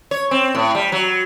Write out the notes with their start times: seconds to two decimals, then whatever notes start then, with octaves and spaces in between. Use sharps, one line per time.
0.11 C#5
0.31 C4
0.55 A2
0.75 G3
0.92 F#3